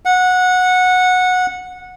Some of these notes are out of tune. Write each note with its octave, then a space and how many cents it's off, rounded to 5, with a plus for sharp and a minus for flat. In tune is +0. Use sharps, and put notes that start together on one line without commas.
F#5 -15